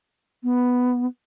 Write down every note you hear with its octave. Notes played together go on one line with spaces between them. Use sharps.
B3